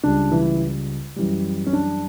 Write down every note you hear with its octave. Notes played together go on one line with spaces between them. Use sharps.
C#2 C#3 G3 D4
E3 E4
F#2 E3 G3
C#4
D4